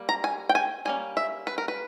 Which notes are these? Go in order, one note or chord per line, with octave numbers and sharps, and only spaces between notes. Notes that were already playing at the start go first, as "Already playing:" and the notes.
Already playing: G3 A#3
A#5
G#5
G5
G#5
G3 A#3 C#4 G#5
E5
B4
A#4
B4